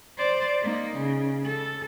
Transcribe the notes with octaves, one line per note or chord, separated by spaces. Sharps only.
C5 D5
A#3 D#4
C#3
A4